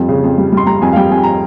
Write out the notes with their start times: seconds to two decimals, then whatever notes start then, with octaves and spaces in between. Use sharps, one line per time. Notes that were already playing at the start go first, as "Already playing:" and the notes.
Already playing: F2 G3
0.09 C#3
0.24 F2
0.38 G3
0.52 G3 C6
0.67 G3 A#5
0.81 F2 G#5
0.93 F5
0.96 G3 G5
1.11 F2 G#5
1.24 A#5